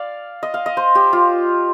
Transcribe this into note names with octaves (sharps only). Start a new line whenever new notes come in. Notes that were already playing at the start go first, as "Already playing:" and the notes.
Already playing: D5 F5
D#5
F5
D#5
C5
G4
F4